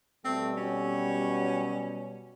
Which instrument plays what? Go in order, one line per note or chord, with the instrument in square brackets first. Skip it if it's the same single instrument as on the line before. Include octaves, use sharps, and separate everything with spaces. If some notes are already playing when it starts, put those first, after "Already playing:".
[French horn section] B2 G3 [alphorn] A3 [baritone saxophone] C4
[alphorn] F#3 [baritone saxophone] C#4